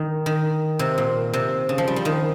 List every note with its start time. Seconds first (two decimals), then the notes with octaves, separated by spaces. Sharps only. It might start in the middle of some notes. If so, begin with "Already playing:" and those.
Already playing: D#3
0.26 D#3
0.79 C3
0.98 A#2
1.33 C3
1.69 C#3
1.78 F3
1.88 G3
1.96 F3
2.05 D#3